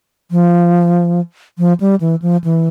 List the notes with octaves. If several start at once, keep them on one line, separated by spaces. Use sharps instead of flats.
F3
F3
G3
E3
F3
E3